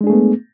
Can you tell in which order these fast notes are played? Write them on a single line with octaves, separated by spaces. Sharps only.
G#3 D4 G#4 A3 B3